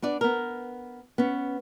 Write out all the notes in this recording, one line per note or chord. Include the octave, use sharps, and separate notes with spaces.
B3 D4 D5
B3 A#4
B3 C#4